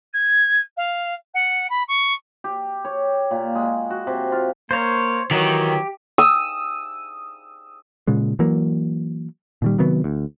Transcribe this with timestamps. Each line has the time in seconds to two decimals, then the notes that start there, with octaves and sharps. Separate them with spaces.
0.13 G#6
0.77 F5
1.34 F#5
1.69 B5
1.88 C#6
2.44 G4
2.85 C#5
3.31 A#2
3.55 G#3
3.90 F#4
4.07 C3
4.32 F4
4.71 A#3 C5 C#5
5.31 D#3 E3 F#3 G4
6.18 D#6 E6
8.07 A#2 C#3 G#3
8.39 E3 F#3 A#3
9.62 A#2 D#3 G3
9.78 C3 D#3 F#3 B3
10.04 D2